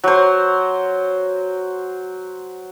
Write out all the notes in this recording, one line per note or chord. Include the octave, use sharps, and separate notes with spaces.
F#3 C5